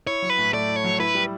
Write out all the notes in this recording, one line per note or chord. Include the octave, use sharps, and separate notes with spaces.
E4 C#5
F#3
B4
A2
A3 D5
E4
C#5
F#3
E4 B4
G3